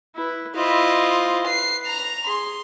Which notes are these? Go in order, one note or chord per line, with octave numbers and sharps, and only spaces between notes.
E4 B4
E4 F4 C5 D#5
B4 C7
A#5 F7
G#4 C6